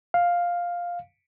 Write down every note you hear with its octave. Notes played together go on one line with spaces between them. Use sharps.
F5